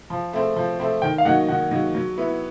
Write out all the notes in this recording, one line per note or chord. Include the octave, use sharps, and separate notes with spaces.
F3
A3 C4
F3
A3 C4
D#3 G5
F5
F#3 A#3 D#4 F#5
D#3 F#5
F#3 A#3 D#4
F#3
B3 E4